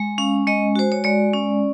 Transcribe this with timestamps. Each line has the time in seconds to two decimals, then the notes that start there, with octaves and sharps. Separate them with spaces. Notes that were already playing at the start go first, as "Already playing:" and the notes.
Already playing: G#3
0.18 C#4 F5
0.47 G#3 D#5
0.76 F#4 C5
0.92 C#5
1.04 G#3 D5
1.33 C#4